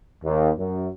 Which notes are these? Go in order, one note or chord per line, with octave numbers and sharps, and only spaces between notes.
D#2
F#2